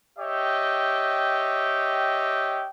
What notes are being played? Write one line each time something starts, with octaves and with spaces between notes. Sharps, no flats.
G4 C#5 D#5 E5 G5